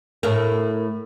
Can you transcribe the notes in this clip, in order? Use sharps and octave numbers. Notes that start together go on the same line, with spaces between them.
A2 A#4